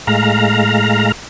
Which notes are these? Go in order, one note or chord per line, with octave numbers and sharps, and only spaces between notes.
A2 G#3 F5 A#5